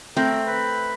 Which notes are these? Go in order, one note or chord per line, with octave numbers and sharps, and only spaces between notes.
A3 C4 A#4
B4